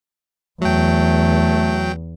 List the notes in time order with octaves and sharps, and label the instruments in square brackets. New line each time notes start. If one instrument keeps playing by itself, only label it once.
[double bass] E2 [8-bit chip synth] F#3 G5 [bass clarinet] A3